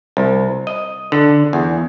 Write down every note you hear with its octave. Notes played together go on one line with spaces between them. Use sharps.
C2
D#5
D3
E2